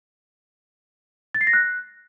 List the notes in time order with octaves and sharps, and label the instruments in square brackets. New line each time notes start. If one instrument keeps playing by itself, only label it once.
[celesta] A6
C7
A#6
F#6